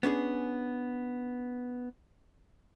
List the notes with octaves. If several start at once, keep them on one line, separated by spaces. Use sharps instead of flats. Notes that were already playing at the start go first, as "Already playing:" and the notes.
B3 C#4 D4 G#4